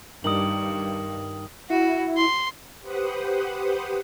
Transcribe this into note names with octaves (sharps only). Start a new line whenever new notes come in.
G2 D#3 A#4 D#6 F#7
E4 F#4
C6
G4 B4 C5 F#5 D#6